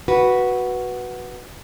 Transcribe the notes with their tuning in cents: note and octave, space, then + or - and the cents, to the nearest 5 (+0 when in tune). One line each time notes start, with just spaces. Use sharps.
F#4 +0 B4 -10